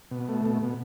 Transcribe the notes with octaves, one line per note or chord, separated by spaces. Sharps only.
B2
A3
B2
B2